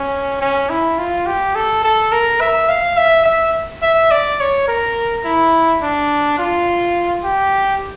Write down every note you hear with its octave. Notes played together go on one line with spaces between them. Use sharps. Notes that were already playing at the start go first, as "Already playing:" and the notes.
Already playing: C#4
C#4
E4
F4
G4
A4
A4
A#4
E5
F5
E5
E5
E5
D5
C#5
A#4
E4
D4
F4
G4